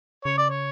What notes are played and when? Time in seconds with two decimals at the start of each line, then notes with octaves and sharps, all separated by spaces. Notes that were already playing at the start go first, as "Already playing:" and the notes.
0.25 C#3 C#5
0.38 D5
0.50 C#5